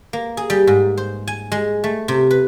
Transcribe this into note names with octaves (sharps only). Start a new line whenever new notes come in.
A#3
G#4
G3
G#2
C5
G#5
G#3
A3
C3
B4